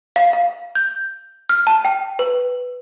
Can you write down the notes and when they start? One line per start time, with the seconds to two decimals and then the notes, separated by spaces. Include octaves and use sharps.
0.16 F5
0.33 F5
0.75 G6
1.49 F6
1.67 A5
1.85 G5
2.19 B4